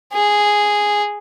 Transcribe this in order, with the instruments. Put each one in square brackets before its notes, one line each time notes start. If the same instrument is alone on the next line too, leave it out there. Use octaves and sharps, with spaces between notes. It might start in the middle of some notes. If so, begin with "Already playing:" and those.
[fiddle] G#4